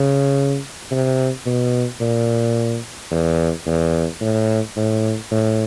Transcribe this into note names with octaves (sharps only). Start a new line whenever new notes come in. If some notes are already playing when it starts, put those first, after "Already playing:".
Already playing: C#3
C3
B2
A#2
E2
E2
A2
A2
A2